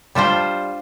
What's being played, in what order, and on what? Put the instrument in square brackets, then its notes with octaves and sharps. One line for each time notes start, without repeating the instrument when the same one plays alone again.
[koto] G3 D4 F4 C5